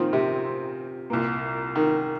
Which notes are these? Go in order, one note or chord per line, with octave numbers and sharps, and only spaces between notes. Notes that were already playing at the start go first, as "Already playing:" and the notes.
Already playing: A#2 D#3 F3 C4 F4
C3
C2 A#2 A#3
D#3